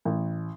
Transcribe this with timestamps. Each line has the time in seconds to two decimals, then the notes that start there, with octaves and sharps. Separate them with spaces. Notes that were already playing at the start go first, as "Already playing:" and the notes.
0.05 A1